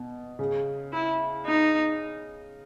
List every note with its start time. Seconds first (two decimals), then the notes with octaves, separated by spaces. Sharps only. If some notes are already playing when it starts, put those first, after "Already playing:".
Already playing: B2
0.39 C#3
0.93 E4
1.46 D#4